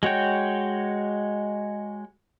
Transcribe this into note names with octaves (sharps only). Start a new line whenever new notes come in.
G#3 F#4 C#5 G5